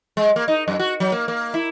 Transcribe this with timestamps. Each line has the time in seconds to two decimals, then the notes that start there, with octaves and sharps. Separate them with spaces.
0.17 G#3
0.36 A#3
0.48 D#4
0.68 F#2
0.79 F#4
1.00 F#3
1.12 A#3
1.28 A#3
1.54 E4